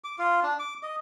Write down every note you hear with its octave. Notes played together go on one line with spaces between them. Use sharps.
D6
F4
D4
D6
D#5